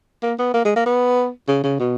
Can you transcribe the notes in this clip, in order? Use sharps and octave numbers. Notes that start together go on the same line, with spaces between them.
A#3
B3
A#3
G#3
A#3
B3
C#3
C#3
B2